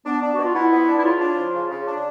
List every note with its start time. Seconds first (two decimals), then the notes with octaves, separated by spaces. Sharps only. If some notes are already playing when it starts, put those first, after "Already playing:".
0.06 B3 D4
0.22 D4
0.34 B2 F#4
0.44 F4
0.55 B3 E4
0.72 B3
0.88 D4
0.99 E4
1.04 C#3 F4
1.21 D4
1.37 F3
1.55 C#3
1.71 C#3
1.88 D4